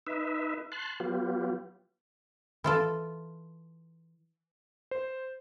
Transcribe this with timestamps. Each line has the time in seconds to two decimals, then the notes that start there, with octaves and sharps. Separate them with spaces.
0.07 D#4 B4 E5
0.72 A5 C6 F#6
1.00 F#3 B3 F4 G4
2.64 E3 F4 A4
4.91 C5